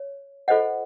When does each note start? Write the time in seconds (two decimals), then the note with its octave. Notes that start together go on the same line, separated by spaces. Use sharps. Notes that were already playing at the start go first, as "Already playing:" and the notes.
Already playing: C#5
0.48 F4 A4 C5 D#5 F#5